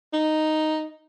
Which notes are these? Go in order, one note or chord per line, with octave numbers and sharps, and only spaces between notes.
D#4